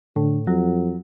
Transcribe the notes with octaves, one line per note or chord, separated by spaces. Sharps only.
A2 D3
F2 F#3